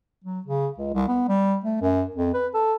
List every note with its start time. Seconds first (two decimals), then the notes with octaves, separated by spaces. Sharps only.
0.24 F#3
0.47 C#3
0.78 C#2
0.94 C2
1.08 B3
1.29 G3
1.64 A3
1.82 F#2
2.16 F2
2.34 B4
2.54 A4